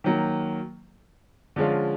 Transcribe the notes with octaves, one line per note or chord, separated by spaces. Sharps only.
D#3 F#3 A#3
D3 F3 G#3 C#4 F4